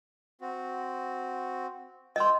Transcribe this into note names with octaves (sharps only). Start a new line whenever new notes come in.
C4 F#4
D#5 G5 C6 D#6 E6